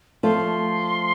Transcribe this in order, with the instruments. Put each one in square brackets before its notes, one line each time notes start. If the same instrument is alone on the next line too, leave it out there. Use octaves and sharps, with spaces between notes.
[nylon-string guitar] F3 A3 [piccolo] C6